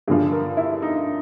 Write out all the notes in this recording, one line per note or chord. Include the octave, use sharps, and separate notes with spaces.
G2 D3 F3 G#4
A#4
E4
D#4